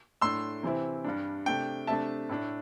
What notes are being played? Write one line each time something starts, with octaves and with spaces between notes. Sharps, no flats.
A2 A3 D4 C6 E6
C3 E3 C4 E4
G2 G3 D4
C3 A3 D4 G5
C3 A3 D4 E5 A5
A2 A3 D4